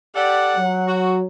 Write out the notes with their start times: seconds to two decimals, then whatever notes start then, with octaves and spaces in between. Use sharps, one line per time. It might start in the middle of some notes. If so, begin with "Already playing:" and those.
0.15 G4 A4 D5 F#5
0.57 F#3
0.87 F#4